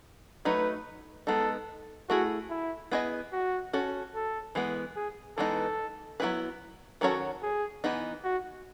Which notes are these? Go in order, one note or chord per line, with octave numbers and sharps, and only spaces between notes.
F#3 A3 D#4 B4
G#3 B3 D#4 A4
A3 E4 F#4 G#4
E4
B3 E4 G#4 D#5
F#4
C#4 F#4 A4
A4
E3 G#3 B3
G#4
E3 G#3 B3 D#4 A4
F#3 B3 E4 G#4 B4
D#3 F#3 C#4 F#4 A4 C#5
G#4
E3 B3 D#4
F#4